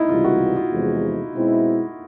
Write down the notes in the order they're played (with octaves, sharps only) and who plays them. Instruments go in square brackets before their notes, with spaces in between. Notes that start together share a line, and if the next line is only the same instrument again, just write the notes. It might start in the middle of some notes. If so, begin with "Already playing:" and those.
Already playing: [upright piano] D#4 E4
[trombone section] C#2 C3 E3 G3 [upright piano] F4
[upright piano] F#4
F4
[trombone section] E2 C3 F3 G#3
B2 G#3 C4 E4